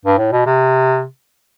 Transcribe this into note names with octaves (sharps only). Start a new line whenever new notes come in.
G2
A2
B2
C3